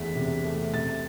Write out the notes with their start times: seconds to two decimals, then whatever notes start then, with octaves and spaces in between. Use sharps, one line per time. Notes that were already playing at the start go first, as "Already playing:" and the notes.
Already playing: E2 E3 A3 B6
0.15 C3
0.45 A3
0.74 C3 A6